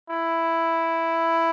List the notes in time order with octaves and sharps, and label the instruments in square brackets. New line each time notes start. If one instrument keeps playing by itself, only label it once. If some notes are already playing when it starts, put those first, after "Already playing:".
[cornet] E4